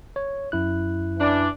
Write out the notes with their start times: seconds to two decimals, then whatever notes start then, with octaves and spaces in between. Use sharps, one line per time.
0.16 C#5
0.52 F#2 E4 F#6
1.19 E3 D4